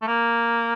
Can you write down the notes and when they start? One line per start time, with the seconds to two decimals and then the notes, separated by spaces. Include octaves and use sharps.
0.02 A3
0.07 A#3